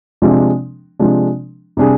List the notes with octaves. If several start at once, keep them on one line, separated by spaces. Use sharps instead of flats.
C3 F3 G#3 D4
C3 F3 G#3 D4
C3 G3 D4 G#4